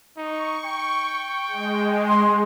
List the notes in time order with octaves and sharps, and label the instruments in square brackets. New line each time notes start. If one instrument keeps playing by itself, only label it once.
[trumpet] D#4 [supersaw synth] C#6
[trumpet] G5
[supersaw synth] G#3
[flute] C6